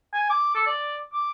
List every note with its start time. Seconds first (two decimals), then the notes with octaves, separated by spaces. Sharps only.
0.14 G#5
0.30 D6
0.55 A4
0.67 D5
1.13 D6